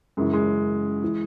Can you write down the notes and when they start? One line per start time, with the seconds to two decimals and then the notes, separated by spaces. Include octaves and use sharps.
0.17 F#2 C#3 E3 G#3
0.33 G#3
1.04 E3